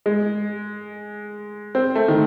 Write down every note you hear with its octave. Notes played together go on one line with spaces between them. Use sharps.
G#3
C4
A3
D#3